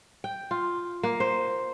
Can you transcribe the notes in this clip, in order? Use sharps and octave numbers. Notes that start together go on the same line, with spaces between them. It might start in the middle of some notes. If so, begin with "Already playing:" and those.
G5
F4
A#3
C5